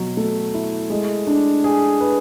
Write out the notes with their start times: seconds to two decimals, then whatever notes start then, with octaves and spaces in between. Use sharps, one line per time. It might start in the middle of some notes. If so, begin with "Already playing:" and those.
Already playing: B2 F#3
0.17 A3
0.54 E4
0.90 G#3
1.27 D4
1.64 G#4
2.00 B4